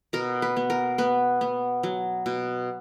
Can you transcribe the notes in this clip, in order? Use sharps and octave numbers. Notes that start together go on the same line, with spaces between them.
B2 A#4
B4
B3
A#4
B3 B4
B3
F#3
B2